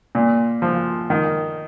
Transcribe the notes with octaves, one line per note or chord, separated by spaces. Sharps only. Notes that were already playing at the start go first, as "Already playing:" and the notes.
A#2
F3
D#3